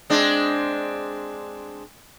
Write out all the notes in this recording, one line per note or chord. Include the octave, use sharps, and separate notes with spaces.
G#3 C4 D4